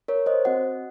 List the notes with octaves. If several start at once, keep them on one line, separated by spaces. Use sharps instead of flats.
A#4 C#5
C5 D#5
C4 F#4 D#5 F#5